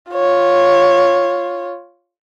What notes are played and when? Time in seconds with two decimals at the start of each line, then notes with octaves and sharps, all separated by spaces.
0.12 F4 C#5